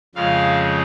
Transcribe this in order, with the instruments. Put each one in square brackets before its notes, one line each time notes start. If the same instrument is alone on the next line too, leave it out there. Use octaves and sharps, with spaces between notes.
[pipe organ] F2 C#3 F3 G#3 F5